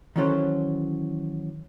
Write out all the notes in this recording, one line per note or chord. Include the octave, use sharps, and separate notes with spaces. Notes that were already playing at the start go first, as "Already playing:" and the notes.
D#3 E3 F#3 C#4 A4 C5